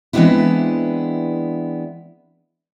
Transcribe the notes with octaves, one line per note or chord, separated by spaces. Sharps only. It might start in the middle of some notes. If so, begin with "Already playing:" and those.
E3 G#3 B3 C4 D4 E4